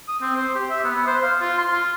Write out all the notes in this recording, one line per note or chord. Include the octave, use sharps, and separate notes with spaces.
D#6
C4
C5
G4
E5
B3
C5
F5
F4
C6
F4